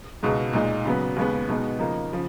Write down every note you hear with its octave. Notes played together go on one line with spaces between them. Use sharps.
C#2 B2 G#3 D#4
A#2 G#3 D#4
C#3 F#3 B3
D#2 C#3 G#3 B3
B2 G#3 B3 D#4
C#3 F3 A#3 D#4
C#3 F3